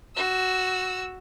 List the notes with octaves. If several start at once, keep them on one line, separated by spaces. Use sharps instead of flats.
F#4 E6